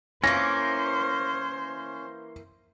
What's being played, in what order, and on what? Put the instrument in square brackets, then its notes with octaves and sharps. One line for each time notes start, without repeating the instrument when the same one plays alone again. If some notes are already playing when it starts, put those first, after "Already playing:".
[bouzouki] E3 A#3 [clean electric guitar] C#4 [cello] C5 [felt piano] A#6